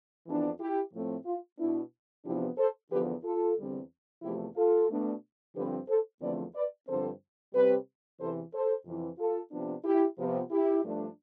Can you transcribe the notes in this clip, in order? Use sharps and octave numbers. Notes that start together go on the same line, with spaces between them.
F2 E3 B3 D4
E4 G4
A2 F3 A3 C4
F4
B2 B3 D4 E4
E2 C3 F3 B3 D4 E4 G4
A4 C5
E2 D3 F3 B3 G4 B4
F4 A4
E2 D3 G3 C4
E2 C3 F3 A3 E4 G4
F4 A4
B2 A3 D4
G2 D3 F3 C4 G4 B4
A4 C5
E2 D3 F3 A3 C4 B4 D5
B4 D5
G2 D3 F3 C4 A4 C5
C3 G3 C4 G4 B4
E2 C3 E3 A4 C5
A4 C5
F2 C3 E3
F4 A4
C3 F3 B3 D4
E4 G4
C3 F3 B3
E4 G4
G2 F3 A3 D4